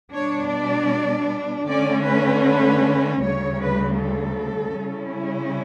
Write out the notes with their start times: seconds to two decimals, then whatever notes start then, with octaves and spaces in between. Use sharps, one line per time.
0.13 B2 G3 D4 C#5
0.51 D5
1.67 D3 A3 C#4 D5
2.05 B4
2.45 B4
3.21 D2 C#3 G3 C#5
3.60 B4
3.98 A4
4.75 C#3 G3 C#4 E4